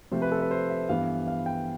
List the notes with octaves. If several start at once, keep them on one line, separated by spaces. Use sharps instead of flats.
C3 F3 A3 C5
B4
A4
B4
C5
E5
G2 E3 B3 F5
F5
G5